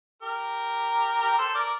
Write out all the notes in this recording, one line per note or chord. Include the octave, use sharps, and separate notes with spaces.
G4 A#4
G4 A#4
A4 C5
A#4 D5